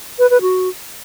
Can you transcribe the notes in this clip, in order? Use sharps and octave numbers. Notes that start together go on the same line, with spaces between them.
B4
B4
F#4